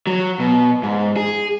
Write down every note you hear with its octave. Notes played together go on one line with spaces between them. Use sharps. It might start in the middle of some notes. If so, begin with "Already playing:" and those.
F#3
B2
G#2
G#4